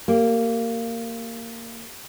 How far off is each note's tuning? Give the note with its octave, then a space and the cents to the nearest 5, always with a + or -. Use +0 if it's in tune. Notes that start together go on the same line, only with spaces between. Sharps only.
A#3 -20 G4 +0